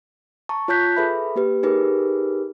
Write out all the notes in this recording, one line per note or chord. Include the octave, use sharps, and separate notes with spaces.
A5 A#5 C#6
F4 C#5 A5 F#6 G6 B6
G#4 A4 B4 E5 B5
A#3 G4 B4
D#4 G4 G#4 A#4 B4